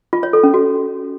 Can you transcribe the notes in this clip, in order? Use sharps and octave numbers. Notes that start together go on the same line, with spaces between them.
F4
C#5
A4
C#4
F#4